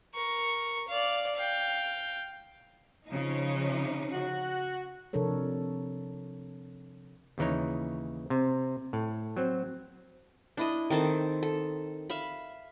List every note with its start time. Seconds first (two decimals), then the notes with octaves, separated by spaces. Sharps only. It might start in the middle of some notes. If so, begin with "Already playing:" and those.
0.14 A#4 C#6
0.88 D5 F5
1.35 F5 G5
3.07 C#3 F3 D#4
4.12 F#4
5.13 C3 F3 D4 A4 A#4 C#5
7.38 D#2 C#3 E3 D#4 C#5
8.30 C3
8.93 A2
9.37 F#3 C4
10.57 D4 E4 D#5
10.90 D#3 C4 A4 A5
11.43 A4
12.10 E5 F5 B5